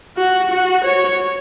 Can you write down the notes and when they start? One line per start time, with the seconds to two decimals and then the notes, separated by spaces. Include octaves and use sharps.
0.17 F#4
0.50 F#4
0.85 C#5